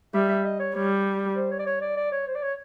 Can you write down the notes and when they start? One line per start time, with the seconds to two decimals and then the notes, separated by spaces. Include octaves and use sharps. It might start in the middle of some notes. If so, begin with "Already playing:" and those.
0.14 G3 E5
0.29 E5
0.44 D#5
0.59 C#5
0.75 G3 C#5
1.36 C5
1.51 C#5
1.59 D5
1.66 C#5
1.81 D5
1.96 D5
2.12 C#5
2.27 C5
2.35 D5
2.42 C#5